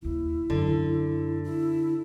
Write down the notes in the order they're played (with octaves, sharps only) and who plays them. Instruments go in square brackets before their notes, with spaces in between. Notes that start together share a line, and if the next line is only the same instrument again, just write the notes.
[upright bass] D#1 D#2 [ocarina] E4
[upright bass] F#2 [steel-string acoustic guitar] D3
[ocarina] E4